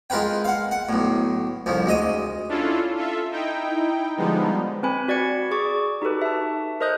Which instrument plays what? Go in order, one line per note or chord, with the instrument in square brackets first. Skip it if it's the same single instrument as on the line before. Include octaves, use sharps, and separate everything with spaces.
[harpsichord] G#3 F4 A#4 B4 G5
F5 F#5
F#5
B1 A2
C2 F2 F3
D2 G#3 D#5 D#6
[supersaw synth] C#4 D4 E4 F4 A4
F4 A4 E5
D#4 E4 G5
D3 F3 G3 G#3 B3 D#4
[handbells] C4 B4 G#5 B5
F#4 D5 G#6 C#7
G#4 D5 C#6 D6
D#4 F#4 G4 A4 B4
E5 A5
A#4 C5 D#5 D#6 F#6 G6